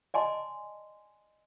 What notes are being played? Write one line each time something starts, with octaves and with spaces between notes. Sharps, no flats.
D5 D#5 G#5 A5 C6